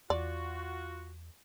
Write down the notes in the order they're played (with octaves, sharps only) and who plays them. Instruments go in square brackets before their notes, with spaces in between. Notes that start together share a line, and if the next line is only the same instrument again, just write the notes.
[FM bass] E2 [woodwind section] F4 F#4 [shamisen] D5